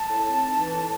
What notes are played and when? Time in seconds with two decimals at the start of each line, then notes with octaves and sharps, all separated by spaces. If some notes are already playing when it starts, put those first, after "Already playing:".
Already playing: A5
0.09 A2
0.25 C4
0.42 D#4
0.57 E3
0.74 A2